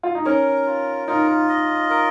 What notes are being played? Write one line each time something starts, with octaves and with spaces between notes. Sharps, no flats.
F4
D#4
C#4 A#4
F4
D#4 F4
D#5
A#4